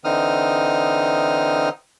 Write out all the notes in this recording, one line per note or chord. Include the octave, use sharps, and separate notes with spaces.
D3 E3 C4 D#4 D#6 F6